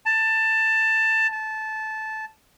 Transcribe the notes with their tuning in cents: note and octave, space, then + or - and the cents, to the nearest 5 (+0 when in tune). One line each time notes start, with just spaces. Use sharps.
A5 +15
A5 -15